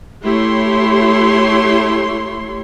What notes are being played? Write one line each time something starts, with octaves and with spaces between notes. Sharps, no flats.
A3 E4 G4 C#5 C6